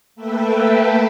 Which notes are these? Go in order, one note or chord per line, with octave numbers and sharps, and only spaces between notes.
A3 A#3 A4 B4 E5 G5